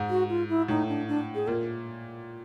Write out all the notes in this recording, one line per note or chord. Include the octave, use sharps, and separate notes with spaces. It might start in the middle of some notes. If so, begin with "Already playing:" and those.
Already playing: G#2
F#4
F4
E4
A2 D#4
D4
D4
G#4
A#2 A#4